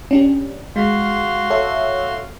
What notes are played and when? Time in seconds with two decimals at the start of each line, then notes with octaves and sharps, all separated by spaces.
0.11 C#4 D4 G4
0.76 G#3 F#4 F5 C6
1.50 A4 C#5 E5